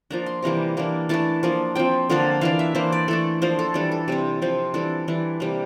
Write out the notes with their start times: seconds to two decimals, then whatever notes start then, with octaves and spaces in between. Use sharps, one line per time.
0.10 F3 A#3 D4 A#5
0.26 C6
0.43 C3 E3 G3 A#3 A#5
0.77 E3 A#3 D4
1.09 E3 A3 D4 A5
1.43 F3 A#3 D4
1.75 F3 C4 G5
2.10 D3 F3 A#3 D4
2.41 E3 A#3 D4 F5
2.59 E5
2.75 E3 A#3 D4 C5
2.92 D5
3.08 E3 A3 D4 A4
3.42 F3 A#3 D4 C5
3.59 A4
3.74 E3 G3 D4 A4
3.92 A4
4.08 C3 G3 C4 G4
4.42 C3 F3 C4
4.74 E3 G3 D4 A4
5.08 E3 G3 D4
5.40 C3 G3 A#3